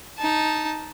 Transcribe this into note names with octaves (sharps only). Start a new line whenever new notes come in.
D#4 A5